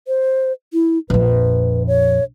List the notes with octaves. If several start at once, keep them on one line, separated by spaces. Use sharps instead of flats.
C5
E4
A#1 F2 B4
C#5